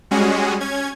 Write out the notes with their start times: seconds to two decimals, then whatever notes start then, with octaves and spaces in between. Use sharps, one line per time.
0.11 G3 G#3 C#4 F#4 G#4
0.60 C#4 G#6